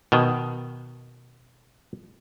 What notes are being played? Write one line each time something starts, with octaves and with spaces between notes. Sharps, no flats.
B2 D#3